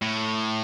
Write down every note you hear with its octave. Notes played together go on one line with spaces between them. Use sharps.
A2